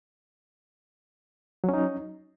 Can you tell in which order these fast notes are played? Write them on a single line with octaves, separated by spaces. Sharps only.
F#3 C#4 D#4